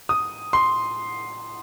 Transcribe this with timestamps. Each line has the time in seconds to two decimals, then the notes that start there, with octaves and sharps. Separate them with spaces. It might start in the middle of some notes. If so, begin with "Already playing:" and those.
0.09 D#6
0.53 C6